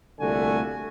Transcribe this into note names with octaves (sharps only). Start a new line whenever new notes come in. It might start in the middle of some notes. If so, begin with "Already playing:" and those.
C2 A#2 D3 A3 F#4 G#5